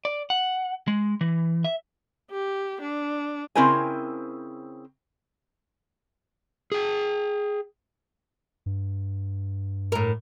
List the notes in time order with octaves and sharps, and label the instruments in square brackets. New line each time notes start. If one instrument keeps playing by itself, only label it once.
[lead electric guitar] D5
F#5
G#3
E3
E5
[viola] G4
D4
[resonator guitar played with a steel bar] C#3 C4 E4 A#4 C5 G#5
[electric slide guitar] G#4 G5
[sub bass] G2
[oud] A2 A#4